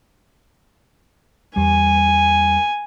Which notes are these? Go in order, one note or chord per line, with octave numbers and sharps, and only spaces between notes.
E2 G3 G#5